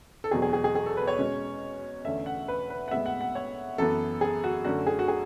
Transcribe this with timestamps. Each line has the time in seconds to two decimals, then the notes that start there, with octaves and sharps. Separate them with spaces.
0.24 A4
0.31 E2 B2 F#3 G#4
0.42 G#4
0.53 G#4
0.64 G#4
0.75 G#4
0.86 A4
0.97 B4
1.07 C#5
1.18 B2 G#3 C#4
2.05 E2 D3 A3 C#4 E5
2.26 F#5
2.48 B4
2.70 B4
2.88 F#5
2.91 A2 G#3 B3 E5
3.06 F#5
3.21 F#5
3.35 C#5
3.78 F#2 E3 B3 A4
4.21 G#4
4.44 F#4
4.65 F#2 D3 A3 C#4 F#4
4.87 G#4
4.99 F#4
5.08 G#4